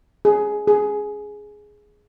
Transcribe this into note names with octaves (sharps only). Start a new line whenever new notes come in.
G#4
G#4